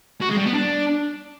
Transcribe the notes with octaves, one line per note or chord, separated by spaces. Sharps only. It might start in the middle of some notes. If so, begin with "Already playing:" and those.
F#4
G#3
G3
B3
D4